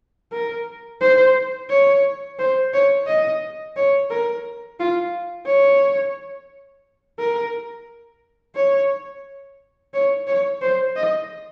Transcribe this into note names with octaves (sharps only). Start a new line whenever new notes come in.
A#4
C5
C#5
C5
C#5
D#5
C#5
A#4
F4
C#5
A#4
C#5
C#5
C#5
C5
D#5